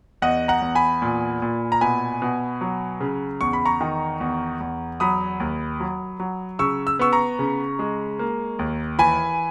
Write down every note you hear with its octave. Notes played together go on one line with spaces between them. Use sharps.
E2 D#5 F#5
F#5 A#5
E2
G#5 B5
A#2
A#2
A#5
B2 G#5 B5
B2
F#3
C#3
E2 C#6
B5
A#5 C#6
D#3
E2
E2
F#3 B5 D#6
D#2
F#3
F#3
C#3 C#6 E6
E6
B3 C#6 E6
A#5 C#6
C#3
G#3
A#3
D#2
E3 G#5 B5